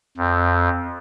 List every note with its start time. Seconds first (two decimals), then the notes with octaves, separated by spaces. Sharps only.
0.17 F2